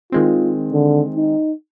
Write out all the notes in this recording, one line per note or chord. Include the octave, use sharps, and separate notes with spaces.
D#3 G#3 C4 F4
D3
D#4